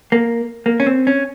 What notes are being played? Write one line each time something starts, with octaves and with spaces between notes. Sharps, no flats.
A#3
A#3
C#4
C4
C#4